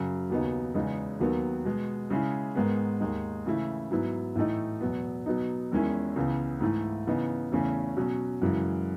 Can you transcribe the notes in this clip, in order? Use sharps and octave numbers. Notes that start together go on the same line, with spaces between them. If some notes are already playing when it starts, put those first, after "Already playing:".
Already playing: F#2 C#3 F#3
D#2 C#3 F#3 B3 D#4
E2 C#3 G#3 B3 D#4
D#2 D#3 F#3 B3
B2 G#3 B3
C#3 G#3 C#4 E4
G#2 D#3 G#3 B3
D#2 D#3 G#3 D#4
C#3 E3 A3 E4
G#2 F#3 B3 E4
A2 E3 A3 D#4
E2 B2 F#3 B3
B2 F#3 B3 D#4
E2 D#3 G#3 C#4 E4
C#2 C#3 E3 B3
G#2 E3 A3 E4
C#3 E3 B3 D#4
E2 C#3 E3 A3 C#4
B2 F#3 C#4
F#2 C#3 E3 G#3